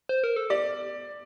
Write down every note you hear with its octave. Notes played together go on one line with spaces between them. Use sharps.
C5
A#4
A4
G4 D5